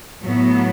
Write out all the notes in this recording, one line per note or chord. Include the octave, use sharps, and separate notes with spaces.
A2 F#3 B3